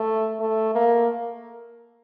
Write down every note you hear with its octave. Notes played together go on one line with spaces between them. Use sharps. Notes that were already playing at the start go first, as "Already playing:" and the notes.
Already playing: A3
A3
A#3